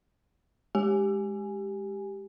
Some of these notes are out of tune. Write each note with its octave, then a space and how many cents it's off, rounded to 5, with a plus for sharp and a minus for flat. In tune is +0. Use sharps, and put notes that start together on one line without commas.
G#3 +0 G4 +0 G#5 +0